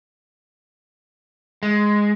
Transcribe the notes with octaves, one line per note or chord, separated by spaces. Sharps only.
G#3